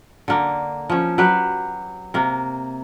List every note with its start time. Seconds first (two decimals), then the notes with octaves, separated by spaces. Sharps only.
0.28 D3 A#3
0.90 F3 C#4
1.18 F#3 G4 B4
2.14 C3 A#3